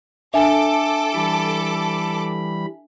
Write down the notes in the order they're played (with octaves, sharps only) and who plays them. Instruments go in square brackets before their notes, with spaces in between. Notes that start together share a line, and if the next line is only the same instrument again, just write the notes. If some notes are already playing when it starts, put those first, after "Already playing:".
[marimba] D4 [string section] A4 D6 [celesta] E5 G#5
[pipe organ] E3 G3 B5